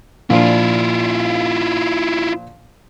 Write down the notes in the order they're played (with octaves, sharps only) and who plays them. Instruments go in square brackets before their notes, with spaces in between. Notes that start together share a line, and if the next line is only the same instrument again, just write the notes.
[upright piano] A#2 F3 D4 [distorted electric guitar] E4 F4